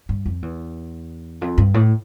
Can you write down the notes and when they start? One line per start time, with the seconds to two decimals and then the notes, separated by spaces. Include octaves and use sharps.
0.09 G2
0.26 F2
0.42 E2
1.41 F2
1.58 G2
1.74 A2